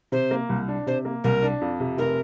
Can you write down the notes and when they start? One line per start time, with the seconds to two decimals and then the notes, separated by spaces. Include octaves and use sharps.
0.12 C3 C5
0.31 A#3
0.49 C2
0.68 D4
0.87 C3 C5
1.05 A#3
1.24 C2 A#4
1.42 D4
1.61 F2
1.80 C3
1.98 F1 A#4